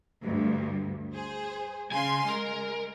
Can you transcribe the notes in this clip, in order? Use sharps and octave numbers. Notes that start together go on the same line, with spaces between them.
D2 G2
G#4 C5
C#3 F5 G#5 C6
G#3 A#4